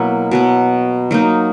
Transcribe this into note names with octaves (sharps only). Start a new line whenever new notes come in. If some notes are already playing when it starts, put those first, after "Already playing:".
Already playing: B2 F#3 A#3 E4
B2 F#3 B3
F#3 A#3 D#4